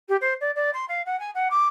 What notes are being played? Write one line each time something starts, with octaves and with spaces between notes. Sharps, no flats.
G4
C5
D5
D5
C6
F5
F#5
G#5
F#5
D6